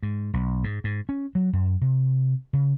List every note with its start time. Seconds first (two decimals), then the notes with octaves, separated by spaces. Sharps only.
0.03 G#2
0.34 B1
0.64 G#2
0.84 G#2
1.09 C#4
1.35 F#3
1.53 F#2
1.81 C3
2.53 C#3